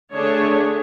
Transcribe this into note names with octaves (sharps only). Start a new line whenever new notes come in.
D3 A3 D4 G#4 C#5